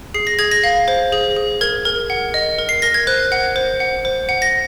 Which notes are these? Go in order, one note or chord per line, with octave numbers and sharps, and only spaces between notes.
G#4 C7
A#6
G#4 G#6
A#6
F5
C5
G#4
G#4
A#4 G#6
A#4
F#5
D#5
A#4
C7
A#4 A#6
G#6
C5 F#6
F#5
C5
F#5
C5
F#5
A#6